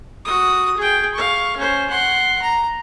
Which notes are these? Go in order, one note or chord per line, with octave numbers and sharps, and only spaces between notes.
F#4 D#6
G#4 G5
F5 C#6
C#4 C5
F#5 C6
A#5